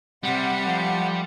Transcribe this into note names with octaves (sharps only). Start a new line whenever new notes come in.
C3 G3 F#5
F3 A3